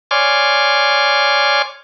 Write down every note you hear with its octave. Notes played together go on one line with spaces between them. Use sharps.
C#5 D5 G#5 C6 D6 F6